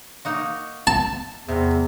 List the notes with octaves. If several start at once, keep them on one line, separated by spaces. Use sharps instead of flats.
A#3 D#4 F#4
A5
E2 C3